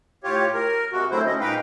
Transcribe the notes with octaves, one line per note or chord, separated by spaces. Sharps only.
A2 F4 G4 C#5
A#4
C3 G#3 A#3 F#4
D3 F#3 A3 C4 E4 C5
C#4 D#5
A#2 G#3 D#4 B4 F5 G5